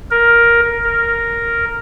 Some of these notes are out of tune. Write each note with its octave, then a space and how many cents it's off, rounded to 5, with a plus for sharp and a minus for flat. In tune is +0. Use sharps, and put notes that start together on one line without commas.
A#4 +10
A#4 +0